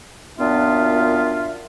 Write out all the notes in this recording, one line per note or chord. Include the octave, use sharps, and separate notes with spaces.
F#2 A#2 B3 D4 F4 E5